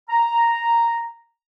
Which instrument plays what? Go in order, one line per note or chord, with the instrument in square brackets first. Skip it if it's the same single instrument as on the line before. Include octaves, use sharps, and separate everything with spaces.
[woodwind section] A#5